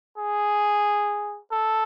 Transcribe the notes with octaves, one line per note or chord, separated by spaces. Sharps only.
G#4
A4